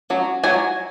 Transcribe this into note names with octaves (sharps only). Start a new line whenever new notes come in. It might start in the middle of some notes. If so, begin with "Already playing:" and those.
F#3 C#4
F#3 G#5